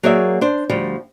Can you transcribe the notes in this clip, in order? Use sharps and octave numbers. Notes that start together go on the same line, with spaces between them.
F#3 A#3 G#4 C#5 D5 E5
D4 C5
D2 F3 G3